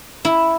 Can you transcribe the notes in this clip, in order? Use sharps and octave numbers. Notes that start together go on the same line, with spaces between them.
E4